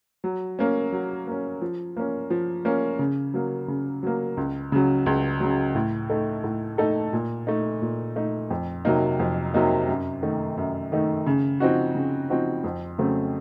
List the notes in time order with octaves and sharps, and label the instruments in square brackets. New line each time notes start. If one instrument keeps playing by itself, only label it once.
[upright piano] F#3
A#3 C#4
F#3
A#3 C#4
F3
A#3 C#4
F3
A#3 C#4
C#3
F#3 A#3
C#3
F#3 A#3
C#2
C#3 F#3
C#2
C#3 F#3
A2
A3 D#4 A4
A2
A3 D#4 A4
A#2
A3 D#4
A#2
A3 D#4
F2
C3 F#3 A#3 D#4
F2
C3 F#3 A#3 D#4
F#2
D#3 A3 D#4
F#2
D#3 A3 D#4
C#3
F3 C4 D#4 F#4
C#3
F3 C4 D#4 F#4
F2
C#3 F#3 A3 C4